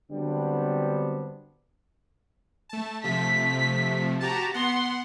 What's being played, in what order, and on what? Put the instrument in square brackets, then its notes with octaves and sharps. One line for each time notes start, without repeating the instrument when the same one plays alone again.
[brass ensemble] D3 F#3 G3 B3 C4 D4
[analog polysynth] A3 A5
[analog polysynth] C3 F3 A3 [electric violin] B6
[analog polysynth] F#4 G4 A5 [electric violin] A#5 A6
[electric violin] B3 C6 [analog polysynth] F#5